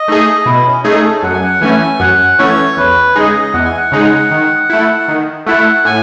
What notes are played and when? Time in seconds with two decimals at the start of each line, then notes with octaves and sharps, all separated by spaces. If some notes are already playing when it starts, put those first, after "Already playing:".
Already playing: D#5
0.08 A3 D#4 G#4
0.46 B2 E4
0.66 C#4
0.84 A3 C#4 D#4 G#4
1.03 A4
1.23 F#2 F#5
1.33 G#5
1.43 F#5
1.61 E3 A3 C#4 G#5
2.00 F#2 F#5
2.38 E3 A3 C#4 C#5
2.77 E2 B4
3.15 C#3 G#3 D#4 G#4 D#5
3.54 E2 F#5
3.65 G#5
3.77 F#5
3.92 C#3 G#3 D#4 G#4
4.31 D#3
4.70 A3 E4
5.08 D#3
5.47 A3 E4 F#5
5.85 A2 G#5